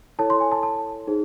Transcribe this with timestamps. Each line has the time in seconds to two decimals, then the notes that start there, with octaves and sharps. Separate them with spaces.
0.19 E4 A4 C#5 A5
0.30 C6
0.40 G#5
0.52 A5
0.63 A5
1.07 D#4 G#4 C5